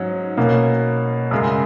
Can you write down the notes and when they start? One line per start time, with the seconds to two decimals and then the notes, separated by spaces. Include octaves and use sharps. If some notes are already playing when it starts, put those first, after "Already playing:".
Already playing: G#2 F#3 C#4
0.37 B2 A#3 C#4
1.31 F#2 C#3 G#3